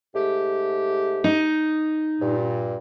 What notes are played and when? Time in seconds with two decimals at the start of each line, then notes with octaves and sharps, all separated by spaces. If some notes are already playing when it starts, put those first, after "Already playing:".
0.15 G#2 A3 G4
1.24 D#4
2.21 G2 A#2